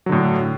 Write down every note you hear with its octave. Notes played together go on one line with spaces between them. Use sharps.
A2 D3 F#3